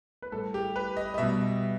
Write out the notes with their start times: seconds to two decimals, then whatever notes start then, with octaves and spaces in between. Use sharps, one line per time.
0.22 B4
0.32 A2 G3 A4
0.54 G4
0.76 B4
0.97 D#5
1.14 D#5
1.18 B2 G3 E5